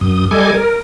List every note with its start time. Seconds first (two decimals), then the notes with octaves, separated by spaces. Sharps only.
0.01 F#2 D#6
0.31 G3 A4 D#5 G#5 D6 G#6
0.54 A#4